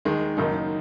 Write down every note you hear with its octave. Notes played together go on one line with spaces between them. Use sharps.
D#2 D#3 G#3
F#1 F#2 D#3 A#3 D#4